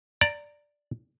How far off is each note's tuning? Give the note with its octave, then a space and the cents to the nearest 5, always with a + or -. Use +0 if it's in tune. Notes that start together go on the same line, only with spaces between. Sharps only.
D5 +0 A#5 -20